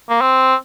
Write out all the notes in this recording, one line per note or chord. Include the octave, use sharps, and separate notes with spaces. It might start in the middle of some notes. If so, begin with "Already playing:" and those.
A#3
C4